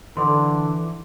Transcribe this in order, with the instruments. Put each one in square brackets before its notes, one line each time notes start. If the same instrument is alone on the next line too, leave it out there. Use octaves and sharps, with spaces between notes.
[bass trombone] D3 [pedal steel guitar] E3 D6 [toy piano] C6